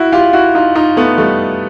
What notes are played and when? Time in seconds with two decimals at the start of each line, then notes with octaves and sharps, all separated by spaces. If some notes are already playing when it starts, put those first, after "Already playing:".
Already playing: E4 F#4
0.12 F4 G4
0.33 E4 F#4
0.55 D#4 F4
0.75 D#4 F4
0.96 A3 B3
1.18 G3 A3